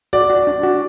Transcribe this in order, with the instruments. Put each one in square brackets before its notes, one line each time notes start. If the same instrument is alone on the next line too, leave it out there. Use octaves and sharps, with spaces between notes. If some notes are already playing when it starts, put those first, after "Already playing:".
[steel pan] F#4 [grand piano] D5
[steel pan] F#4
D4
F#4